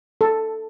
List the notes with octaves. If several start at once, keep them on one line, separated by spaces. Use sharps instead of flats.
A4